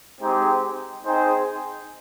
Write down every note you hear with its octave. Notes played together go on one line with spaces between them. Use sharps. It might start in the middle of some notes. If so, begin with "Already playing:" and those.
G#3 C4 D#4 G4
C4 D#4 G#4 C5 G5